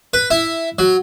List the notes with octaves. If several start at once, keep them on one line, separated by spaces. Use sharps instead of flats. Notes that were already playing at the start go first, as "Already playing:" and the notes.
B4
E4
F#3